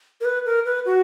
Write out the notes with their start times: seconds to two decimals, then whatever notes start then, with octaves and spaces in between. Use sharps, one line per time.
0.21 A#4
0.25 B4
0.46 A#4
0.66 B4
0.86 F#4